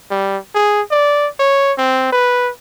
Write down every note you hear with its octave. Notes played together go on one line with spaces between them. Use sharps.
G3
G#4
D5
C#5
C4
B4